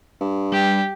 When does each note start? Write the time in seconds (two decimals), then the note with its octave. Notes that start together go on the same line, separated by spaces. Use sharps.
0.21 G2
0.52 G3 G4